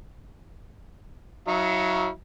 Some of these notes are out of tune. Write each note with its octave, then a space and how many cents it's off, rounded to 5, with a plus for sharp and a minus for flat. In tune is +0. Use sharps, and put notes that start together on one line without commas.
F#3 +0 E4 -40 F5 -45